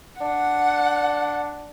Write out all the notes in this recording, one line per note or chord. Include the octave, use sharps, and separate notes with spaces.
D4 F#5